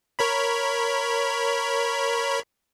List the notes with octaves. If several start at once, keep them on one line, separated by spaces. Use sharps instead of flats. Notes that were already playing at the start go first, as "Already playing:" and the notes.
A#4 C#5 B5